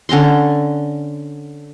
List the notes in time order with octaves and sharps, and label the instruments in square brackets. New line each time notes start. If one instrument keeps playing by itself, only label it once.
[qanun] D3 C#4 A#5 C6